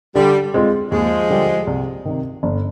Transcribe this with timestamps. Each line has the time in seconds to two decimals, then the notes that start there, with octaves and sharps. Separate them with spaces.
0.15 D3 G3
0.54 G#3 C4 F4
0.91 D#2 F3 G#3
1.30 D3 G3 D4 G4
1.67 C2
2.05 C3 D#3
2.43 G1